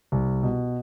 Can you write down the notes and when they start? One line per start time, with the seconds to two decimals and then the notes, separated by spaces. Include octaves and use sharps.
0.12 C2
0.43 B2